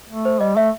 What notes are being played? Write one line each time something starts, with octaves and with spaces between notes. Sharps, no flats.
A3
C5
G3 D#5
A3 E5